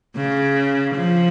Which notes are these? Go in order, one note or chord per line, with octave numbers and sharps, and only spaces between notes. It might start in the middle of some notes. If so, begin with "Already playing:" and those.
C#3
F3